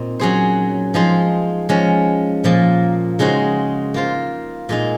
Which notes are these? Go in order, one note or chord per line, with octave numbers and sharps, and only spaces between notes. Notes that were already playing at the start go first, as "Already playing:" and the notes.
Already playing: A#2 C4 D#4
F#3 C#4 G#4 C5
F3 G#3 D#4 G#4 C5
F3 G#3 C#4
A#2 F3 A#3
C#3 G#3 D#4 F#4 C5
A#3 F4 C5
A#2 G#3 D#4